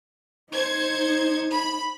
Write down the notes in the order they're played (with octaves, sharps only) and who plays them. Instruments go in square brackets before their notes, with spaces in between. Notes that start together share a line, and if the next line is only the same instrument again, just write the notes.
[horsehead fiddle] D#4 [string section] C5 G#6 C#7
[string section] B5